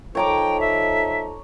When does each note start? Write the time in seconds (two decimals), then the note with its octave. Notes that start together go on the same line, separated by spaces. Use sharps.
0.15 F3 D#4 A4 C#5 G5 A#5 D6
0.60 E5